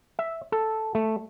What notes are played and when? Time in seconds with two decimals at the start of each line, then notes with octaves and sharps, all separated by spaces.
0.19 E5
0.52 A4
0.95 A3